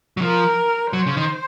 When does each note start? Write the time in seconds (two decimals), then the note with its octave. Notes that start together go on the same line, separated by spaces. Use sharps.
0.17 F#3
0.22 F3 A#4
0.93 F#3 C5
1.07 C#3
1.17 D#3